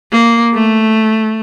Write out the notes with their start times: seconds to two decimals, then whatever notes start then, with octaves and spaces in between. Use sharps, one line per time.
0.12 A#3
0.54 A3